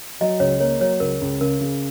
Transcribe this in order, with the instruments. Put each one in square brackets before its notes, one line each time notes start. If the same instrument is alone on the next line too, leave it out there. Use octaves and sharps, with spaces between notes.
[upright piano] F#3 [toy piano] D#5
[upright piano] C#2 [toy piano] C#5
[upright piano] A#3 [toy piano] C#5
[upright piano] F#3 [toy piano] C#5
[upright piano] C#2 [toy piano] A#4
[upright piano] C#2
[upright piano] C#3 [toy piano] A#4
[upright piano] C#3